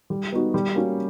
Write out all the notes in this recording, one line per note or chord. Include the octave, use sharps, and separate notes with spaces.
G3
B3 D#4 F#4
G3
A#3 C#4 F#4